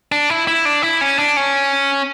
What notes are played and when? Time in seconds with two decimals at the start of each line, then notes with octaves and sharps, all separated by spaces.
0.12 D4
0.30 E4
0.47 E4
0.65 D4
0.83 E4
1.01 C#4
1.19 D4
1.37 C#4